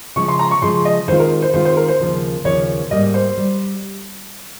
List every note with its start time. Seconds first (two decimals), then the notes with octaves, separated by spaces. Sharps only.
0.16 C#3 F3 G#3 C#6
0.28 C6
0.39 A#5
0.51 C#6
0.62 C#3 F3 G#3 C6
0.85 D#5
1.08 D#3 G#3 C4 F4 C5
1.20 A#4
1.42 C5
1.54 D#3 G#3 C4 F4 C5
1.65 C5
1.77 A#4
1.88 C5
2.00 D#2 C#3 F3 A#3
2.45 D#2 C#3 F3 A#3 C#5
2.91 G#2 G3 A#3 D#5
3.14 C5
3.38 G3